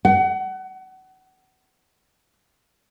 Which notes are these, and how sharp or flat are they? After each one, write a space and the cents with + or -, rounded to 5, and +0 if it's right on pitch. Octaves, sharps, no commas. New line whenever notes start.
F#5 +30